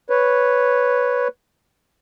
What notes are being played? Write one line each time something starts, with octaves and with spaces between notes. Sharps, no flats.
B4 C#5